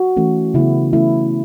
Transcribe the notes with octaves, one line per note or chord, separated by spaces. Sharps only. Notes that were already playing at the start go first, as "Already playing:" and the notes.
Already playing: F#4
E3 A3 C#4
C#3 F#3 B3 E4
C#3 E3 A3 C#4 E4